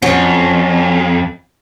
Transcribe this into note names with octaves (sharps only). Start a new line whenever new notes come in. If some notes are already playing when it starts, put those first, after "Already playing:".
F2 F#3 C#4